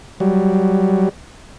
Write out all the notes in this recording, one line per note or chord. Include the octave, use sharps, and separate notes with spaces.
F#3 G3